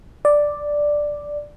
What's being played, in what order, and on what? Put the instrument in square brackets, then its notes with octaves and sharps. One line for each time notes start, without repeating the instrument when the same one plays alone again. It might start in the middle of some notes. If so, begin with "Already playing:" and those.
[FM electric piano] D5